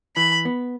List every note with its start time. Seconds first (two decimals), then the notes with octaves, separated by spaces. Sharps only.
0.16 E3 B5
0.45 B3